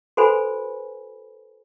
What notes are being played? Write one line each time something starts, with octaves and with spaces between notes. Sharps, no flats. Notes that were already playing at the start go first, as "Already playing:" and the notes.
F#4 A4 B4 C5 G#5 B5